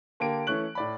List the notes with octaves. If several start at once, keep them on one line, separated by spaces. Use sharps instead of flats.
D3 A#3 G4 D7
E3 A3 C#4 C#6 F#6 F#7
A2 D5 B5